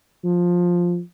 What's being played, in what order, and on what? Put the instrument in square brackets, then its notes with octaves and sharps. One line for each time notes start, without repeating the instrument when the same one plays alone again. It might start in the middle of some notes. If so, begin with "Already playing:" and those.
[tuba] F3